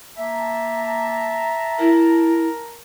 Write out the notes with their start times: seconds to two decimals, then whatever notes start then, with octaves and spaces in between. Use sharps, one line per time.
0.16 A#3 E5 A5 A#5
1.79 E4 A#4